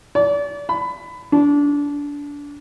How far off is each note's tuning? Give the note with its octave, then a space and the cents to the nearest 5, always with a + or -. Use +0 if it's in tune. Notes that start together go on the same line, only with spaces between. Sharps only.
D5 -30
B5 +20
D4 -25